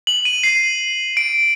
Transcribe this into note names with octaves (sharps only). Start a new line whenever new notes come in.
F#7
D#7
C7
D7